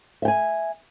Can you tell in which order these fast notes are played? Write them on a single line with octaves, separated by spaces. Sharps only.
E5 G5 G#5